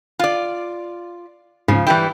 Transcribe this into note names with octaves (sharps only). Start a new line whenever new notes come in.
F4 D5
C#2 G#2 C#3 F3
E3 G3 E4 G5